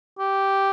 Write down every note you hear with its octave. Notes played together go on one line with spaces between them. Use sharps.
G4